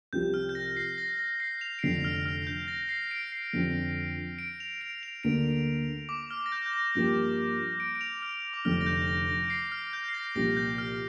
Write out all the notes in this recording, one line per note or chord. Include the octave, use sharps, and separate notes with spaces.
C2 C3 F3 C4 F4 G6
F6
G6
A#6
C7
A#6
A#6
C7
F7
D7
F1 F2 D3 C7
F6
F6
G6
A#6
C7
D7
C7
F2 D3 F3 C4
D7
F7
D7
F7
D2 D3 A#3 D7
D6
F6
A#6
G6
G6
A#6
G2 F3 A#3 G4
D7
D7
F7
F6
D6
F1 F2 D3 F6
A#6
G6
A#6
A#6
D7
C7
F6
G6
C7
A#6
C2 A#2 F3 A#6
G6
F6